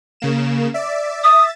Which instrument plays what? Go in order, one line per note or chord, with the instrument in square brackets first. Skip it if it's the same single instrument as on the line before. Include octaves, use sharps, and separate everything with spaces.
[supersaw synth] C#3 A#3 E7
D5 E5
[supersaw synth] E5 A6 [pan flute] D#6